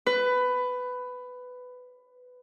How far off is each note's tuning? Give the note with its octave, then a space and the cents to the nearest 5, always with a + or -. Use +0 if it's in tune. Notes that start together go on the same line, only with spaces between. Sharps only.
B4 +15